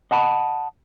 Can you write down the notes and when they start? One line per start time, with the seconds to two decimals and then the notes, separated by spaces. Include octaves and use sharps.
0.11 D#5 F#5 A5 B5